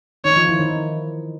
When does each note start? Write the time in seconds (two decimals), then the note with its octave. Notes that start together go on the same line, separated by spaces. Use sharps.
0.25 D#3 D#4 C#5
0.36 F3 F4
0.49 E3 E4
0.59 D#3 D#4